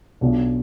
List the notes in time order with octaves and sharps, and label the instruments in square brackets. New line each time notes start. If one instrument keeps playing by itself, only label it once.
[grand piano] B1 B2 B3 D4 F4